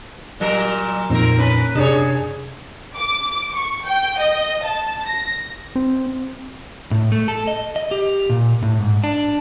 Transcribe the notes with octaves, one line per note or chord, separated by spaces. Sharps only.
A#2 F#3 A#4
F2 A#2 C4 D#4 A#4
C#4 B4
F#2 C3 D4 G#4 C#5
D6
C#6
G5
D#5
A5
A#6
C4
A2
A3
A4
D#5
D#5
G4
A#2
A2
G#2
D4